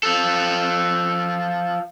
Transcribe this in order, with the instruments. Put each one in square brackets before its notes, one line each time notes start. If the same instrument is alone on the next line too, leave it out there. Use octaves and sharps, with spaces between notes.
[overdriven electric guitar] F3 A4